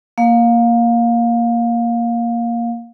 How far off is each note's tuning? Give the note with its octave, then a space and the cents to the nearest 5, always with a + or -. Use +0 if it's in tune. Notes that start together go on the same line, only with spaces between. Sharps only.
A#3 +0 F5 +20